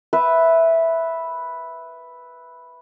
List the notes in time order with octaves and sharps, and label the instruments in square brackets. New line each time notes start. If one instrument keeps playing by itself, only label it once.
[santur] B4 E5